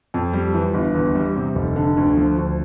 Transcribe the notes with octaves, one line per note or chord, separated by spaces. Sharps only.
F2
G3
E3
G1
E2
G3
C3
F1
D3
D2
F3
D2